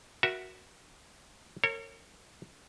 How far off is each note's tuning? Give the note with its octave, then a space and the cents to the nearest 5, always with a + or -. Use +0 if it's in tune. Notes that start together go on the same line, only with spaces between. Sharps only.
F#4 +0 A#4 +25 E5 +0
A#4 -40 C#5 -20